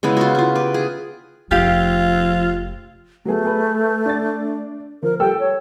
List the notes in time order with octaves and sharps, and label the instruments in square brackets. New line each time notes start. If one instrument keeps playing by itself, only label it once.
[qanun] C#3 G#3 B3 E4
F4 F#4
E4 F4
G4 B4
G#4
[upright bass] F1 A3 [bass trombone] F3 [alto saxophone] F4 [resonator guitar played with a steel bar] G4 F5
[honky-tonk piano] F#3 B3 G#4 [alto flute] A3
[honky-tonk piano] G#4 B4
D4 A6
[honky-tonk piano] F3 [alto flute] A#4
[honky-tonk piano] G3 A4 E6 [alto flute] G5
[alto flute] C#5